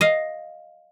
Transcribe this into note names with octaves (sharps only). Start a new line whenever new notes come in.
D#5 F5